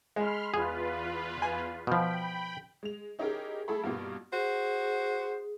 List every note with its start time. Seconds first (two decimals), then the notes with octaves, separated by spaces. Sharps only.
0.16 G#3 B5 C6 F6
0.54 E2 F4 G#4 B4
1.42 G#5
1.87 B2 F3 G5 B5
2.83 G#3 F7
3.19 C#4 D#4 E4 G4 G#4 A#4
3.68 A3 E4 G#4 A4 B5
3.84 G2 B2 A#3 B3 E4 F4
4.33 F#4 G#4 C5